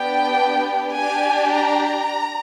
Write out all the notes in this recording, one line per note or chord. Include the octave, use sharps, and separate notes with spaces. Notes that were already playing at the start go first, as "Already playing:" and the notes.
Already playing: B3 D4 G4 G5
D4 G4 G#5
A#5